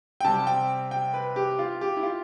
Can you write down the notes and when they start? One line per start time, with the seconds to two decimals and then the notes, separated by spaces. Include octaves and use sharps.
0.20 G5
0.24 C3 G3 C4 A5
0.47 G5
0.91 G5
1.14 B4
1.36 G4
1.59 F4
1.81 G4
1.97 E4
2.03 F4